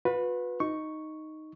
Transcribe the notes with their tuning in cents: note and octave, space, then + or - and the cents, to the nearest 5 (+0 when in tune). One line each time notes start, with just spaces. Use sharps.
F#4 -45 B4 +0
D#4 +0 C#6 +0